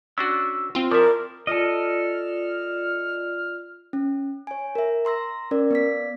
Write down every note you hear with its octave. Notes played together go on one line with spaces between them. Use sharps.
C#4 D4 F#4 E6
C4 F4
F3 E4 A#4 D5 E5 D6
F4 A4 D5 D#5 F6
C#4
C#5 G#5
A#4 E5
A#5 C6 E6 A#6
C#4 A#4 D5
B3 D5 B6